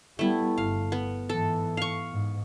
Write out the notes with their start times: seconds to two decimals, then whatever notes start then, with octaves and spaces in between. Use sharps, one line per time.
0.19 G3 A3 B3 E4
0.58 G1 F5
0.92 B3
1.29 G#2 E3 A4
1.77 F5 C#6
2.12 G#2